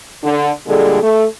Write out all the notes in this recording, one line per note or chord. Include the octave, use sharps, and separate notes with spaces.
D3
A#2 D3 G3 G#3 G#4 A4
A3